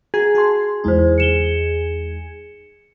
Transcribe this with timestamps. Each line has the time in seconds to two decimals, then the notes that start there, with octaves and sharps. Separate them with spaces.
0.14 F#4 G#4 A#5
0.35 F#4 A5 C6
0.84 E2 G#3 D#4 E4 C5
1.18 C#7 E7 G7